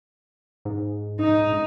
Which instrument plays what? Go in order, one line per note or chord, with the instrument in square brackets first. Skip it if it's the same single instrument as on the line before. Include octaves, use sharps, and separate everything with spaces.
[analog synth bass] G#2
[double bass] D#4